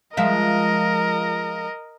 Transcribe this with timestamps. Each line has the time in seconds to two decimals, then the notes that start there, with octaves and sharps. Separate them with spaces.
0.17 F3 G#3 A#4 D#5 E5